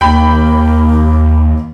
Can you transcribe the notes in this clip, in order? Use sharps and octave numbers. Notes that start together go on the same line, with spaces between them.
D#2 A#3 G5 B5